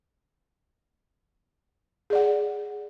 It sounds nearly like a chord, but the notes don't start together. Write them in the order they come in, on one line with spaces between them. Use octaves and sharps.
G#4 D5 F#5